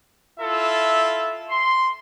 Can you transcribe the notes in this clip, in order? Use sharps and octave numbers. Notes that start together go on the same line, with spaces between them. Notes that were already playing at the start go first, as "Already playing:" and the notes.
E4 F4 A4 E5
C6